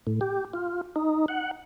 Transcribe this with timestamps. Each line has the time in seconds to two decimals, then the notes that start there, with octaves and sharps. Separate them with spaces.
0.07 A2
0.21 G4
0.53 F4
0.96 D#4
1.28 F#5